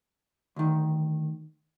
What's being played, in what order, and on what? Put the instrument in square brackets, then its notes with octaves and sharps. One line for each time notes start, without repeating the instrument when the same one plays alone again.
[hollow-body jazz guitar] D2 D#3